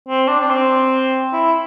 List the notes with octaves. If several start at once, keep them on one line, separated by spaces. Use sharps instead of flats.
C4
D4
D4
C4
E4